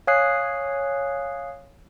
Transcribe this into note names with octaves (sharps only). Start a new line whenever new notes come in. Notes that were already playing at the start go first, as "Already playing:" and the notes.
C#5 F5 G#5 D#6 F#6 C7